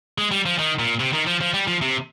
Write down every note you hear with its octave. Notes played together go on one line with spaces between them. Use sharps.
G#3
G3
F3
D#3
A#2
C3
D#3
F3
F3
G3
F3
C3